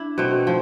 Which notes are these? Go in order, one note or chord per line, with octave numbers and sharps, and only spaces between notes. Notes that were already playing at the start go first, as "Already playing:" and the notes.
Already playing: D4 E4
B2 A3 C4
F3